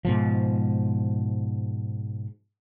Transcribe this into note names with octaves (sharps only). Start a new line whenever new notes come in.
G#2 B2 F3